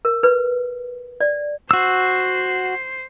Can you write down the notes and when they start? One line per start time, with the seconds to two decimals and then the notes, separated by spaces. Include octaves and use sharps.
0.05 A#4
0.23 B4
1.21 D5
1.71 F#4 C5 E6 C7